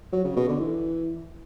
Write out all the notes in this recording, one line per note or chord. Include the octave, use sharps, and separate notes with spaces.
F#3
C#3
B2
D3
E3